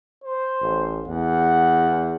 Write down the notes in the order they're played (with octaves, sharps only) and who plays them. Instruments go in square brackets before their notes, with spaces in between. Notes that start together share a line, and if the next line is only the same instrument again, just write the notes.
[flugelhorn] C5
[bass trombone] A1
[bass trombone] E2 [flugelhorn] F#5